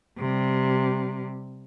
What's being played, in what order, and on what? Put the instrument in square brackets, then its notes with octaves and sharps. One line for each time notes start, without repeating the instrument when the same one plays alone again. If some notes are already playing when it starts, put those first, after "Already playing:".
[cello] C3 G3